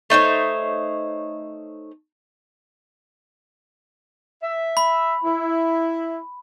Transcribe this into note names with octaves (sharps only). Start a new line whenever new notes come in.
A3 D#4 C5 C#5
E5
B5
E4